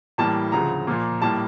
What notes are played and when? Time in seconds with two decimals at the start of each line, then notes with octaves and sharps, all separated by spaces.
0.18 A2 E3 G3 A#3 A5
0.52 D2 C#3 F3 A#5
0.87 A#2 F3 A#3
1.22 A2 G3 A#3 A5